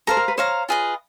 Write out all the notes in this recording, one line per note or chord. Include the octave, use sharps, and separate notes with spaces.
A4 C5 F5 A#5
A#4
B4
C5 C#5 F5 A#5
F4 G#4 B4 D#5